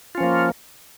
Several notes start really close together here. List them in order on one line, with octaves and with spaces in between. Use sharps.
F4 C#4 F3 A#3